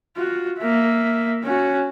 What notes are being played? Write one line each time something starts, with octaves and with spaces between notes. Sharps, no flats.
F4 F#4
A#3 E5
C#4 F#4